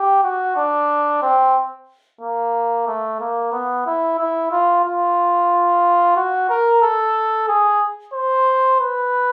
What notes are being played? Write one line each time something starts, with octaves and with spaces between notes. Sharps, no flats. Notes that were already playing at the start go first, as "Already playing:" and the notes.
Already playing: G4
F#4
D4
C4
A#3
A3
A#3
B3
E4
E4
F4
F4
F#4
A#4
A4
G#4
C5
B4